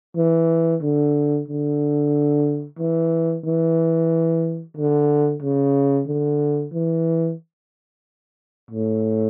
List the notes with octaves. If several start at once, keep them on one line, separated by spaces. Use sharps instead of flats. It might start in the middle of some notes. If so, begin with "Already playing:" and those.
E3
D3
D3
E3
E3
D3
C#3
D3
E3
A2